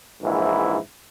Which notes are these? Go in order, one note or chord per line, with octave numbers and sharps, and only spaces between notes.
A#1 G#2 E3 E4